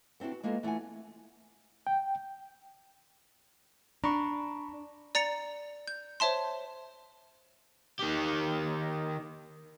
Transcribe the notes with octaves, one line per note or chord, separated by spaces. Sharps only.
B3 C4 D4 E4 F#4
F#4
G#3 A#3 B3 F4 G#4 A4
E3 A3 F4 F#5 G#5
G5
D4 A#5 B5 C#6
D5 A#5 A6 C#7 F7
G6
C5 C#5 E5 A5 C6
D#3 G4